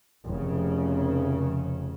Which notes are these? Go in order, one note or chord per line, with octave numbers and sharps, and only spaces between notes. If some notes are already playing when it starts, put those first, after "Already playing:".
F1 C#3